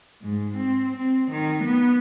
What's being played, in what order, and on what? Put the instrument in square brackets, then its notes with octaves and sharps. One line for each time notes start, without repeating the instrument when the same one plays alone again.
[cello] G#2
C4
C4
D#3
B3